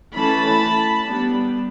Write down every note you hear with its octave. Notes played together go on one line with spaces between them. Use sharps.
E3 A3 C#4 A5 B5
G3 B3 D4